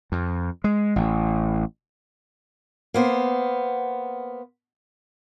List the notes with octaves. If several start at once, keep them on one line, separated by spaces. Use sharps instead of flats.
F2
G#3
A1
A#3 B3 C5